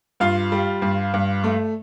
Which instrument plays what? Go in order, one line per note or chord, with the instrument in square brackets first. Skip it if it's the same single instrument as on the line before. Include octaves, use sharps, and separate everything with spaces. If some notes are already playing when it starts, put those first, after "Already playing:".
[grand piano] G2 F4 F5
G3
G2
G2
A3